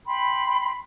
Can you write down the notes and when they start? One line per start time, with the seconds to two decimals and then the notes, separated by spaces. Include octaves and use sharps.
0.06 G5 B5 C6